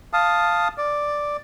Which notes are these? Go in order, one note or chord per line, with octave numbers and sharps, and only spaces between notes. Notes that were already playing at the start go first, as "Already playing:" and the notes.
F5 A5 D#6
D5